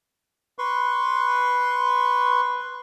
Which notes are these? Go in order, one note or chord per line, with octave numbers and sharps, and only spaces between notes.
B4 C6 C#6